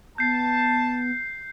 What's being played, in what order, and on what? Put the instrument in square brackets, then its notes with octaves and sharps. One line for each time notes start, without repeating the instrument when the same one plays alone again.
[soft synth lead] B3 [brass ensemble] A5 [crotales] G6 C7